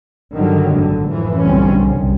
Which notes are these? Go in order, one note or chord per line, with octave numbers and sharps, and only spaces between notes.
G2 D3 D#3 F#3 G3
G#1 A2 D3
F#2 A2 E3 F3
F#1 B1 D3 G3 C4 C#4
C2 F#2